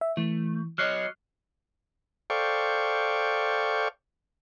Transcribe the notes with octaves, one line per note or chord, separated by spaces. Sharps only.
E5
E3 A3
F#3 C#5 D#5 F6 F#6 C7
A4 C5 D5 F5 G5 C#6